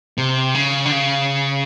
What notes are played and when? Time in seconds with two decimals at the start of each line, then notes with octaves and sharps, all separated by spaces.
0.18 C3
0.55 C#3
0.85 D3
0.92 C#3